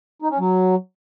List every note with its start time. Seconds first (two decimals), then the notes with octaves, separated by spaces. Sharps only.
0.22 D#4
0.31 C#4
0.39 F#3